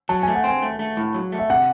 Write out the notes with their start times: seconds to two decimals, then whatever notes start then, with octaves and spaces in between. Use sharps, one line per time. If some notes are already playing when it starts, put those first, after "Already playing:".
0.09 F#3 A5
0.23 A3 G#5
0.35 F#5
0.44 C4 G#5
0.62 A3
0.79 A3
0.97 A2
1.14 F#3
1.32 A3
1.39 E5
1.49 C3 F#5